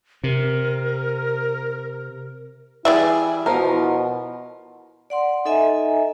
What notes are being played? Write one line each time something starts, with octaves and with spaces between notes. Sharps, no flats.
C3 A#4
E3 G3 E4 G#4 D5 E5
B2 F3 A#4
D5 F#5 C6
D#4 A4 D#5 E5 G#5 A#5